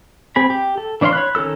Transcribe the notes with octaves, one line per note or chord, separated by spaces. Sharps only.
C4 G#4 B5
G4
A4
E3 D4 C#5 F5 C6
C#5 B5 F#6
D#3 C#4 F4 A4 E6